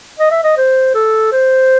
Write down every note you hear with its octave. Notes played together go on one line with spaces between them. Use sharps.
D#5
E5
D#5
C5
A4
C5